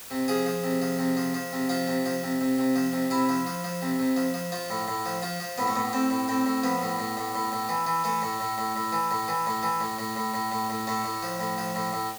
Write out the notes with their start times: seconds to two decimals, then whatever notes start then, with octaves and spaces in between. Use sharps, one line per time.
0.11 C3
0.28 F3 G#4
0.46 F3
0.64 C3
0.82 F3
0.99 C3
1.17 F3
1.34 F3
1.53 C3
1.69 F3 F4
1.88 C3
2.06 F3
2.23 C3
2.41 C3
2.58 C3
2.76 F3
2.93 C3
3.10 C3 E4
3.29 F3
3.47 F3
3.64 F3
3.82 C3
3.99 C3
4.16 F3
4.34 F3
4.52 F3 F4
4.70 A2
4.88 A2
5.06 F3
5.22 F3 F4
5.40 F3
5.58 A2 B3
5.67 A3
5.76 A2 B3
5.93 A2 C4
6.10 A2
6.28 A2 C4
6.46 A2
6.63 F3 B3
6.82 A2
6.99 A2
7.17 A2
7.35 A2
7.52 A2
7.69 E3
7.86 E3
8.04 E3 A3
8.22 A2
8.40 A2
8.58 A2
8.76 A2
8.92 E3
9.11 A2
9.28 E3
9.46 A2
9.63 E3
9.80 A2
9.99 A2
10.16 A2
10.34 A2
10.52 A2
10.70 A2
10.87 A2 A3
11.04 A2
11.23 F3
11.40 A2
11.58 F3
11.75 A2
11.93 A2